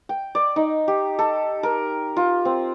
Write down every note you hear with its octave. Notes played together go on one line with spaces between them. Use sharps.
G5
D5
D#4
G4
A4
A#4
F4
C4